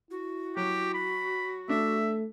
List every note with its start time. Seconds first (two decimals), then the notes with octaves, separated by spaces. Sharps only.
0.11 E4 F#4
0.57 F#3 G4
0.94 B5
1.69 A3 D4 E5